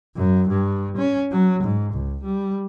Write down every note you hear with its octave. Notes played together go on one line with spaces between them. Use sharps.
F#2
G2
C#4
F#3
G#2
C#2
G3